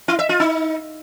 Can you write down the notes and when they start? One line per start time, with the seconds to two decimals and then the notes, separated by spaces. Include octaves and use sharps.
0.08 E4
0.19 E5
0.29 F4
0.40 D#4